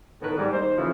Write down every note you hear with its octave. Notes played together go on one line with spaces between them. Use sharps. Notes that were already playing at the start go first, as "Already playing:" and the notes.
A2 D#3 B3 A#4 B4
G#2 G3
D#2 D#4 C5
C#3 E3 F3 A3 E4